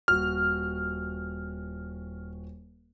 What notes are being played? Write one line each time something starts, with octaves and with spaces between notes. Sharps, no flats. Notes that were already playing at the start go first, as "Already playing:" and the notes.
D#1 F#4 F6